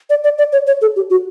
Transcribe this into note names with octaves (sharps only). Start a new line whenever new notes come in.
D5
D5
D5
C#5
C#5
A4
G4
F#4